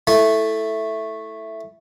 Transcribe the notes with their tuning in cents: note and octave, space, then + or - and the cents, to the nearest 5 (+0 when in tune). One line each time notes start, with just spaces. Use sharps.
A3 +0 E4 +0 G#5 +40